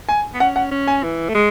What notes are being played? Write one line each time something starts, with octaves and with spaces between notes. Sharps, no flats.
G#5
B3
C#4 F#5
F#5
C#4
G#5
E3
A3
G#3